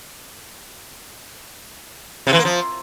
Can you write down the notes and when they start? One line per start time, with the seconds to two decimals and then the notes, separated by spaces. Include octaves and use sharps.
2.27 C3
2.33 E3
2.39 A#3
2.45 F3